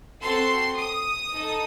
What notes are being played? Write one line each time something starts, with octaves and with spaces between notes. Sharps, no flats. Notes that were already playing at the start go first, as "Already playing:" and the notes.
C4 F#4 A4 C6
D#6
D#4 A4